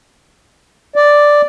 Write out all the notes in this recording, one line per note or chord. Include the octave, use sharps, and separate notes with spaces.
D5